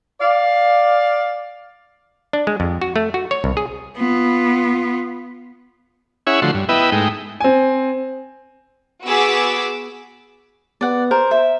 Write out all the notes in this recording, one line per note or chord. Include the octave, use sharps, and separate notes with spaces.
D5 F5
D4
G#3
F2
F#4
A3
F#4
C#5
C2
G#4
B3 F4
C#4 E4 G#4 C#5 E5 F#5
D3 F3 A3 F#4 C6
G2
B3 E4 B4 D#5 E5 G5
G#2 G#3 A3 D#4 G5
C4 G#5
B3 F#4 G#4 D6 E6 B6
B3 D5 F#5
A#4 C5
E5